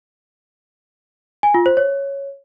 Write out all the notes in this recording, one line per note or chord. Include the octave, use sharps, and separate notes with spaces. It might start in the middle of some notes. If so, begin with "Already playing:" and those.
G#5
F4
C5
C#5